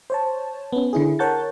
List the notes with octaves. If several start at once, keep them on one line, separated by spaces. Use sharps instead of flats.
C5 C#5 A5
B3 C#4
D3 E4 G#4
A#4 C#5 F#5 A5 G6 A6